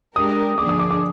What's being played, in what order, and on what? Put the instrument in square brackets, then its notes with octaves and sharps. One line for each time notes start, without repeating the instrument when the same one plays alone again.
[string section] G#3 D4 G4 A#4 [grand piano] D#6
[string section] D3 F3 A#3 D4 G#4 [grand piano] D6
[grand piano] D#6
D6
D6